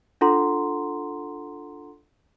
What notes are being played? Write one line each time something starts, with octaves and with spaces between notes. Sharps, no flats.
D4 F4 A4 F#5 A#5 C6